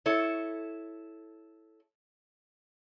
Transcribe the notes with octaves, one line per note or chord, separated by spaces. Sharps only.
E4 A4 C#5